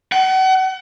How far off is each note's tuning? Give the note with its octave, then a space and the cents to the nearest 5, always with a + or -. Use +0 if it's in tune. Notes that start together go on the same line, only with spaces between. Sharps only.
F#5 +35